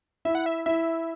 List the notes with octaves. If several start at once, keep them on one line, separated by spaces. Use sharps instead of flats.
E4 E5
F#5
E5
E4 E5